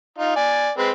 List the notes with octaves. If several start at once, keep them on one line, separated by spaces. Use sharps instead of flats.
D#4 F4
D5 G#5
G#3 C4 B4